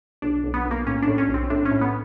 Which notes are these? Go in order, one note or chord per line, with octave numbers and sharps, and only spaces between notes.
B1 D4
B1
B3
B1
A#3
A2 C#4
D4
A2
C#4
B1
C4
A2 D4
C#4
A2
B3